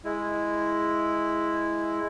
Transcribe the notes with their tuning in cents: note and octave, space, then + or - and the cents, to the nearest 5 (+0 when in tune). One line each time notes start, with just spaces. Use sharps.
G#3 +0 E4 +0